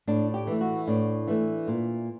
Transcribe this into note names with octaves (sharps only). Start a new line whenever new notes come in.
A2 D4
G4
E3 A3
F#4
A2 D4
E3 A3
A#2